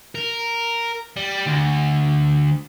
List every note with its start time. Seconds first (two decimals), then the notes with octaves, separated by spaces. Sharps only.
0.15 A#4
1.16 G3
1.46 D2